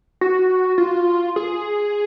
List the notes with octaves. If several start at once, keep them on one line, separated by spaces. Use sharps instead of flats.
F#4
F4
G#4